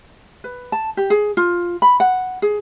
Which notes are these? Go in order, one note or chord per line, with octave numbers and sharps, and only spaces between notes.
B4
A5
G4
G#4
F4
B5
F#5
G#4